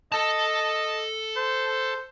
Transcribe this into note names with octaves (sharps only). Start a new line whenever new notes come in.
A4 D#5 A5
C5